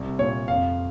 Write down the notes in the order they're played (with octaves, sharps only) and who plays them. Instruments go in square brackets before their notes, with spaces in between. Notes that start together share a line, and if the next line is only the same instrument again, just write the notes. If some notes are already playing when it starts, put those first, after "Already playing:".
Already playing: [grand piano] C2
A#2 C#5
F2 F5